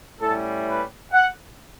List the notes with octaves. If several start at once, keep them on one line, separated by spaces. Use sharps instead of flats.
A2 G3 C#4 E4 A4
B4
F#5